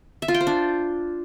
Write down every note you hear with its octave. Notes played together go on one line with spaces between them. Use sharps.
E5
F4
G5
C5
D4